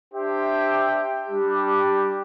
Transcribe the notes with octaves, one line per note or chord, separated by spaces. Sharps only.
D4 G4 C5 E5 G5
G3 D4 G4